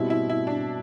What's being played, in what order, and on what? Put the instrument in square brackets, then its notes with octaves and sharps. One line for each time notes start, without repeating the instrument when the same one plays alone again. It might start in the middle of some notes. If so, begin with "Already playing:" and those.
Already playing: [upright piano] B2 G3 C4 [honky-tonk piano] E4
[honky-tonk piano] E4
E4
D4